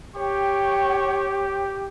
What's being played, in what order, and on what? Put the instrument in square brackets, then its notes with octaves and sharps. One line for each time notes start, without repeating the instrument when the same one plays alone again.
[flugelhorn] G4 [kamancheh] C#5 G5